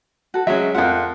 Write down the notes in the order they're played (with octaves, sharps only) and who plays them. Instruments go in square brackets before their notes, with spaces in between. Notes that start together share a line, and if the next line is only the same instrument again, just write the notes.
[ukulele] F#4 A4
[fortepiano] F#3 G#3 C#4 [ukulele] E5
[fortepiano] F2 F#5 [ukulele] F4 A#4 F5